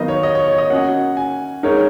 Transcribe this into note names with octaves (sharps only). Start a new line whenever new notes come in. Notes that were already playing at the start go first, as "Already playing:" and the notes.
Already playing: D#3 F#3 B3 D#4 D#5 F5
C#5
D#5
C#5
C#5
D#5
A#3 C#4 F#4 F#5
G#5
G#3 D#4 A#4 C#5